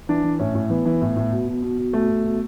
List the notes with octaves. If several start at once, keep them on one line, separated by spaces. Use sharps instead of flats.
E3 D4
E3
A2 C#4
A2
E3 B3
E3
A2
A2
B2
B2
B2
B2
B2 A3
B2
B2